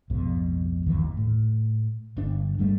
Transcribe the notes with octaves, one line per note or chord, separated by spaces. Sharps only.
B1 F2 G#2 B2
G1 D#2 E3
A2
G1 D4
G2 G3 A3 D4